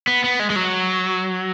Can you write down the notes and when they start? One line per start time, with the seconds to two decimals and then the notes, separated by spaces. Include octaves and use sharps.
0.07 B3
0.24 B3
0.39 G#3
0.50 G#3
0.56 F#3